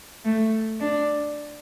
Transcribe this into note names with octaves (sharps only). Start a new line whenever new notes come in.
A3
D4